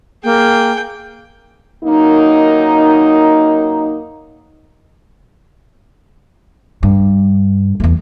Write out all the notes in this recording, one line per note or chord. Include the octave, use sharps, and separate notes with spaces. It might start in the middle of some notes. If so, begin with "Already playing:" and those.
A#3 G#4 G5
F#2 A#3 D#4
G2
E2 A3